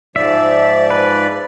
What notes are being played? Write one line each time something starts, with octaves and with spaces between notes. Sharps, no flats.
G#2 F3 D5 E5
B4